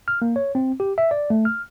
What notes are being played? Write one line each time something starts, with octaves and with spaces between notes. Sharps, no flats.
F6
A#3
C#5
C4
G4
E5
D5
A3
F6